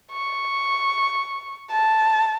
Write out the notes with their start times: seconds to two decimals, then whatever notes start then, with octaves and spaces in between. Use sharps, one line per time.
0.12 C#6
1.72 A5